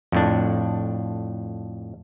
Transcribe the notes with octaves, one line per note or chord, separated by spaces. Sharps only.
F2 A2 D4